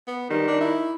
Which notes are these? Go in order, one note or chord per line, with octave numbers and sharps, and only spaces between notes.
B3
D#3 G3
D4
E4